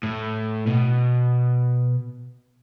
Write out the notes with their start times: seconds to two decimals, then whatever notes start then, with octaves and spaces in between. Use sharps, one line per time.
0.03 A2
0.67 B2